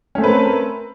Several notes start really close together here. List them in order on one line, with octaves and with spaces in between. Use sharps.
C#4 A3 C4 B4 A#4